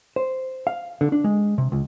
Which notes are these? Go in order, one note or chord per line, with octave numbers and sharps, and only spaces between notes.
C5
F5
D3
D4
G#3
C3
C#2